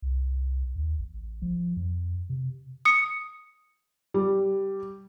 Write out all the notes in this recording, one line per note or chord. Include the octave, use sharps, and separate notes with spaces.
C2
D#2
A1
F3
F2
C3
D#6 C#7
G3